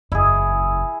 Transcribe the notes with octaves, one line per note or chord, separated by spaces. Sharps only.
F#1 E2 E4 G#4